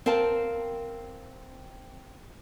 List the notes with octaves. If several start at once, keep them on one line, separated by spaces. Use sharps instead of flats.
C4 A#4 F5 G5 A5